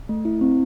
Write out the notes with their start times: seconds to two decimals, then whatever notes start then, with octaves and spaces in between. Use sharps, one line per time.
0.09 A3
0.25 E4
0.41 C4